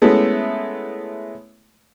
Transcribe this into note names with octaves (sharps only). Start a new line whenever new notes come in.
G#3 A3 B3 C#4 E4